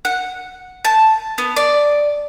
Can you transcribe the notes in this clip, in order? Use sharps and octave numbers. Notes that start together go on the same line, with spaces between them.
F#5
A5
B3
D5